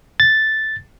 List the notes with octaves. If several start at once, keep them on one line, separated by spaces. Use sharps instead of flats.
A6